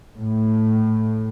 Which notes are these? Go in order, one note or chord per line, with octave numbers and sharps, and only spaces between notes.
A2